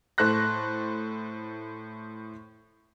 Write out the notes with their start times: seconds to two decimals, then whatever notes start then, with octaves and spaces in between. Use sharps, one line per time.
0.18 A2 A4 C5 F#6 A#6